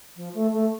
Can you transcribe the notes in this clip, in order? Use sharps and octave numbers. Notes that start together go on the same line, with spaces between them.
F3
A3
A3